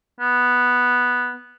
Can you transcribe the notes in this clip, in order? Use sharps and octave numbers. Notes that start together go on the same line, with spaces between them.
B3